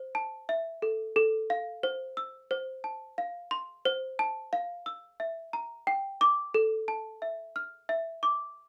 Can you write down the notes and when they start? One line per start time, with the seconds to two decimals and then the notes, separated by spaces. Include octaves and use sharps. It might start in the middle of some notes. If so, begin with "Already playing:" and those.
Already playing: C5
0.15 A5
0.49 E5
0.82 A4
1.16 A4
1.50 F5
1.83 C5
2.17 E6
2.51 C5
2.84 A5
3.18 F5
3.51 C6
3.85 C5
4.19 A5
4.53 F5
4.86 E6
5.20 E5
5.53 A#5
5.87 G5
6.21 D6
6.54 A4
6.88 A5
7.22 E5
7.56 F6
7.89 E5
8.23 D6